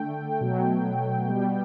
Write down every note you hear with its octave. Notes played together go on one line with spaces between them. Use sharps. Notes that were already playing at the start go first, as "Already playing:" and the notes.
Already playing: D3 A3 G5
B2 F#3 A3
B2 G3